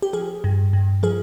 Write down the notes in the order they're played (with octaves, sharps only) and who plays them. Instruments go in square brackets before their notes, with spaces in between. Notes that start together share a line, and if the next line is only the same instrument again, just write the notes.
[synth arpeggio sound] G4
F3 G#4
G2
G2
F3 G#4